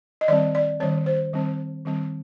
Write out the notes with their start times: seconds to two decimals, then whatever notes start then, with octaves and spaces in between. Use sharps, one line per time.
0.21 D#5
0.28 D#3 G3 C4 D5
0.55 D5
0.80 D#3 G3 C4 C#5
1.06 C5
1.33 D#3 G3 C4
1.85 D#3 G3 C4